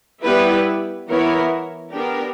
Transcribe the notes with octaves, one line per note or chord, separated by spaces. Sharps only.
G3 B3 E4 G4 B4
E3 B3 E4 A#4 C#5
B3 D4 G4 A#4